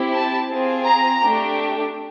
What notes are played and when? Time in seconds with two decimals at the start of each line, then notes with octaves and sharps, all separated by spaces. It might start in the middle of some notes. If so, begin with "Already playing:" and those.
Already playing: C4 E4 G4
0.14 A5
0.50 C4 F4 G#4
0.86 A#5
1.23 A3 D4 G4